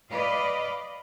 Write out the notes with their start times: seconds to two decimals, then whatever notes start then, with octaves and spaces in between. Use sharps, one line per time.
0.10 B4 D5 D#5 F5